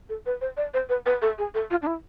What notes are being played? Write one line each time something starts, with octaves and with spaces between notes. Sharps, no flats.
A4
B4
C5
D5
C5
B4
B4
A4
G#4
A4
F4
D4
E4